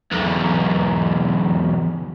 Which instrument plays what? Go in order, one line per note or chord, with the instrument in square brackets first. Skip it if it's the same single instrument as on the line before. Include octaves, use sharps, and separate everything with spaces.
[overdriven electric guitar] B1 E2